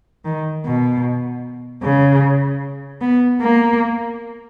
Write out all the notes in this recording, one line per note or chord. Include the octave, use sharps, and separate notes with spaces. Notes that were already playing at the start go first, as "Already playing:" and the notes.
D#3
B2
C#3
B3
A#3